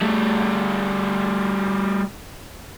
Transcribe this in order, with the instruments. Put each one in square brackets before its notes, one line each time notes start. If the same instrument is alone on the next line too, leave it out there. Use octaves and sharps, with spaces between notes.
[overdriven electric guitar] G3 A3